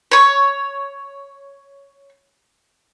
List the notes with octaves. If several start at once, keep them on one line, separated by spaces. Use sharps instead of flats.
C#5 C#6